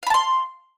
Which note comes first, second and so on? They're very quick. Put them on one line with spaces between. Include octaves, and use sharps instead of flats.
F5 B5 A5 C6